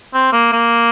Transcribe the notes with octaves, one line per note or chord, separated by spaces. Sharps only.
C4
A#3
A#3